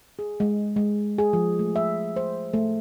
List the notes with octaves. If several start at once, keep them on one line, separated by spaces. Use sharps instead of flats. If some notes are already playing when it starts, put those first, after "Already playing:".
G#4
G#3
G#3
G#4
F3
A3
E5
C5
A3